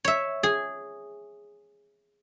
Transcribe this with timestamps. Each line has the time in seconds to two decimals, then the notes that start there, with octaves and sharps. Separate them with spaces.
0.05 C#5 E5
0.43 G#4